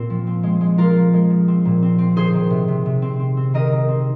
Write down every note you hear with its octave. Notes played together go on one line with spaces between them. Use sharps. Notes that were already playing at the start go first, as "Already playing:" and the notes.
Already playing: A#2 C4 F4
F3
C4
G#3
G#3
F3 F4 A#4
F3
G#3
F3
C4
A#2
C4
C4
D#3 G#4 C5
D#3
C3
C3
C3
C4
C4
C4
D#3 A#4 D#5
D#3
C4